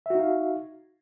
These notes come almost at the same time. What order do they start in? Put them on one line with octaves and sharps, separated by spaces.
E5 F#4 D#4 F5